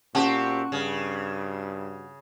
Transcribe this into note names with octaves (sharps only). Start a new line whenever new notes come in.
A#2 C4 C#4 F#4 G4 F#5 A5
G2 C#3